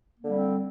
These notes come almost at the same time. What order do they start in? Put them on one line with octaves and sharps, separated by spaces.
A#3 D3 G3 C4